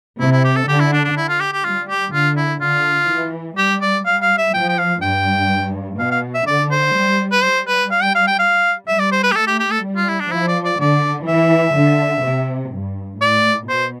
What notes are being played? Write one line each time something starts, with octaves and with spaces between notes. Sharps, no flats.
C3 E4
E4
G4
A4
D3 G4
E4
D4
D4
E4
F4
G4
G4
G3 F4
G4
D3 F4
E4
D3 F4
E3
G3 G4
D5
G3 F5
F5
E5
F3 G5
G5
F5
G2 G5
B2 F5
F5
E5
D3 D5
C5
G3
B4
G3 C5
B4
F5
G5
F5
G5
F5
G3 E5
D5
C5
B4
G4
A3 A4
G4
G4
A4
G3
F4
E4
D4
F3 E4
D5
D5
D3 D5
E3 E5
D3
C3
G2
A2 D5
B2 C5